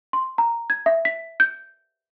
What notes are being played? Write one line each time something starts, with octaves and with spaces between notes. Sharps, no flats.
C6
A#5
G#6
E5
B6
G6